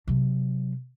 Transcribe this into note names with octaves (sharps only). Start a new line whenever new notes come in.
C3 F#3